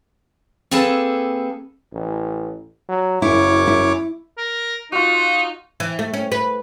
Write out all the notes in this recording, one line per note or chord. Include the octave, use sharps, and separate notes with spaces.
A#3 C4 G#4 A4 B4 A5
A1
F#3
F#1 F#2 E4 C#5 D6
E4
A#4
D#4 F4 F#4
E3
A3
C#4
B4